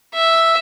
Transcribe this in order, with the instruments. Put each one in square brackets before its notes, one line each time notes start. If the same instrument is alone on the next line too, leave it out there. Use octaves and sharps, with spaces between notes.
[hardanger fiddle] E5